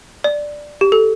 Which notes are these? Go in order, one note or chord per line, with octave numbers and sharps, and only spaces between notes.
D5
G4
A4